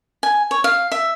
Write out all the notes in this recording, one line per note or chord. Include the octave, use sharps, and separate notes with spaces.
G#5
C#5
F5
E5